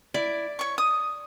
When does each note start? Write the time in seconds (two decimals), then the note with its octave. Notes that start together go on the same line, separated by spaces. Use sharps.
0.14 E4 D5
0.59 C#5 C#6
0.78 D#6